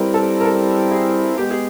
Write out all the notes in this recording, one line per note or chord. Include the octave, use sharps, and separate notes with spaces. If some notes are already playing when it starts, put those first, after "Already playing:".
Already playing: G3 C4 E4 A#4 B4
A4
A#4
A4
G#4
G#3 B3 G4
G#4